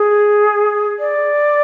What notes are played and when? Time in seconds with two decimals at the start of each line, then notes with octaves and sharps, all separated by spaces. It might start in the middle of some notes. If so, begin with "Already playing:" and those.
Already playing: G#4
0.99 D5